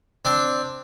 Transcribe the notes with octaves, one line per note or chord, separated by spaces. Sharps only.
C4 D4